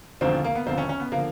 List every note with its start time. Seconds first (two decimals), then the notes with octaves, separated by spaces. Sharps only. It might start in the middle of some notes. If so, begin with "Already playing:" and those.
0.21 E1 D#2 D3 F3 C4
0.44 A#3
0.55 B3
0.66 E1 D#2 D3 F3 C4
0.78 C#4
0.89 C#4
1.00 B3
1.12 D3 F3 A#3